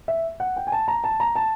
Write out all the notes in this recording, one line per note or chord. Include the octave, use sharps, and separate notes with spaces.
E5
F#5
G5
G#5
A5
A#5
A5
A#5
A5